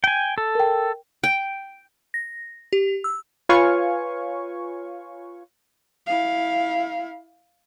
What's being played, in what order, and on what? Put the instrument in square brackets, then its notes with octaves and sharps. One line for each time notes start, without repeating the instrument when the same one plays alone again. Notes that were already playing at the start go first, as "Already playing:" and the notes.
[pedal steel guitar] G5 G#5
A4
[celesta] A#4 G5
[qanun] G5
[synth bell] A#6
G4
E6
[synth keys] F4 B4 C#5 F5 G#5 C#6
[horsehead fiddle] E4 F5